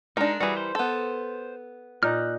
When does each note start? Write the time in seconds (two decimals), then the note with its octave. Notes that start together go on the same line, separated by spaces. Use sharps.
0.17 G#3 D4 D#4 A#4 F5
0.41 E3 G3 F#4 G#4
0.57 C5
0.75 B3 A4
2.03 A#2 D#4 F6 F#6